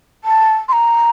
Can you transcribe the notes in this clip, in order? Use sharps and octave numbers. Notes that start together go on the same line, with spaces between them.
A5
C6
A#5